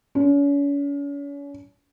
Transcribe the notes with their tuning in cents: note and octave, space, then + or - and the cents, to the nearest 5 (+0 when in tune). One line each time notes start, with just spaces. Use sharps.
C#4 +40